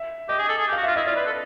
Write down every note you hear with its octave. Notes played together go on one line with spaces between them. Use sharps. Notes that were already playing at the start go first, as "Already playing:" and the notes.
Already playing: E5
G4 D#5
G#4
A4
G#4
G4
F#4 F5
F4 E5
E4 D#5
F4 D5
B4
A4